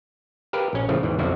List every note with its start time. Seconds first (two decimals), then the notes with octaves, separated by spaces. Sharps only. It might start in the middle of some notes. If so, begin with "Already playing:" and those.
0.53 G4 A#4 B4 F5
0.73 A#1 C#4
0.89 A2 C#3 E3 F3 A3
1.03 D#2 G#2 E3
1.19 B1 F2 D3 F3 E4 F#4